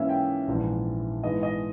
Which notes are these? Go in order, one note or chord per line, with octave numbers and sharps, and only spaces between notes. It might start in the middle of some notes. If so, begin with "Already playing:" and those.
Already playing: G#2 E3 A#3 C#4 E5
G5
A#1 G#2 E3
G#2 E3 G#3 B3 D#4 D#5
D#5